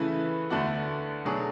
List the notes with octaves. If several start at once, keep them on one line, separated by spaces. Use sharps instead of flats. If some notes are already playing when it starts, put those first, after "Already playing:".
Already playing: C#3 E3 A3 E4 B4
D2 D3 A3 D4 F#4
B2 F#3 A3 D4 G#4